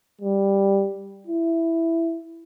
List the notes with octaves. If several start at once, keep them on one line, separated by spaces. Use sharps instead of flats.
G3
E4